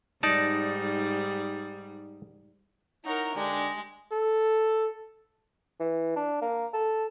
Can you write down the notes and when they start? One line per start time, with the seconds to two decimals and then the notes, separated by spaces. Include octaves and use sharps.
0.23 G#2 G3 D#4 D5 A5
3.05 D#4 E4 A#4 C#5 F#5
3.35 D3 G#3 D4 G4
4.12 A4
5.80 E3
6.16 D4
6.42 A#3
6.74 A4